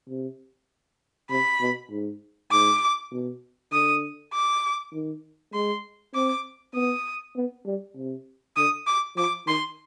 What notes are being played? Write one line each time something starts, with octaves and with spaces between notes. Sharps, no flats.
C3
C3 B5
B2
G#2
G#2 D6
B2
D3 D#6
D6
D#3
G#3 C6
C4 D6
B3 D#6
B3
G3
C3
D3 D#6
D6
F3 D6
D#3 C6